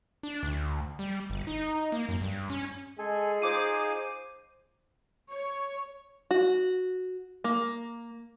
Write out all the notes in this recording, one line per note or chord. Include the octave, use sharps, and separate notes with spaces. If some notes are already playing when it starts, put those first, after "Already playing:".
D4
D2
G3
G1
D#4
A#3
F#2
G2
C#4
G#3 G#4 A4 G#5
D#4 F4 C5 G#5 D6 D#7
C#5
F#4
A#3